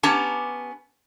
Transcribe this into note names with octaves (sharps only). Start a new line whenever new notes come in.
B3 C#4 G4 A5 A#5